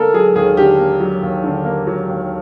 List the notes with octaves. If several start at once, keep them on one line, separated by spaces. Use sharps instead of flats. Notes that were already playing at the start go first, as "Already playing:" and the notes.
Already playing: D3 A#3 A4 A#4
F#3 G#4
D#2 G#4
D3 G4
A#3
F#3
D#2
D3
A#3
F#3
D#2